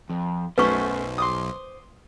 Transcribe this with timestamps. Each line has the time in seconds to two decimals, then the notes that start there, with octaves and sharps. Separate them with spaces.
0.10 F2
0.58 B1 F#2 A3 B4 C5 C#6
1.18 C6 D6 D#6